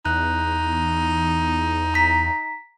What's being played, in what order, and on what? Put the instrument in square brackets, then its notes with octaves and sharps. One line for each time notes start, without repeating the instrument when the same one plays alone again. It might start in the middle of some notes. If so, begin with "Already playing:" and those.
[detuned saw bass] E2 [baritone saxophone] D#4 [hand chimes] F#6
[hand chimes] A#5 B6